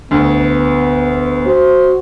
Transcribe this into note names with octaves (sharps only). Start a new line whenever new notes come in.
D2 B3
F#4 C5